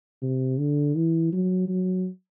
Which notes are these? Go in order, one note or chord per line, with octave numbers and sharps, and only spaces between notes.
C3
D3
E3
F#3
F#3